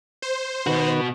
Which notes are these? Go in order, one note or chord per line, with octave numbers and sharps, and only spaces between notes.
C5
B2 D#3 F#4 B4